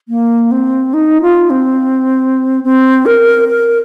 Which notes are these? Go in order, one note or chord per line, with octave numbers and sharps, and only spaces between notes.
A#3
C4
D#4
F4
C4
C4
A#4
A#4